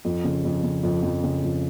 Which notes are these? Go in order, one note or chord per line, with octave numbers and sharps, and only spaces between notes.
F2
C#3
F2
C#3
F2
F2
C#3
F2